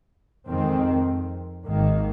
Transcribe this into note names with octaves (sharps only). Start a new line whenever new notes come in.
F2 D#3 G#3 C4
G#1 G#2 D#3 A#3